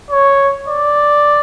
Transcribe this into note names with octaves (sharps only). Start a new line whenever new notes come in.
C#5
D5